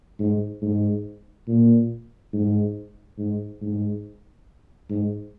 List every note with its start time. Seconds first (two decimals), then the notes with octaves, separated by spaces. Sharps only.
0.20 G#2
0.62 G#2
1.48 A#2
2.34 G#2
3.19 G#2
3.62 G#2
4.90 G#2